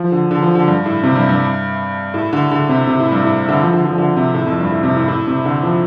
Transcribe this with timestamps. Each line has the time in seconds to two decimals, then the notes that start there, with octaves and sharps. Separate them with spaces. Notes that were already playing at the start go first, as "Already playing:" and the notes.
Already playing: F3
0.12 D3
0.31 D3
0.42 F3
0.55 D3
0.68 G2
0.86 A2
1.03 C3
1.15 G2
1.29 G2
2.14 A2
2.33 D3
2.51 D3
2.69 C3
2.87 C3
3.00 A2
3.12 G2
3.25 A2
3.49 D3
3.61 F3
3.73 D3
3.85 F3
3.98 D3
4.16 C3
4.35 A2
4.46 F2
4.60 G2
4.72 A2
4.83 C3
4.97 A2
5.08 A2
5.27 C3
5.45 D3
5.63 F3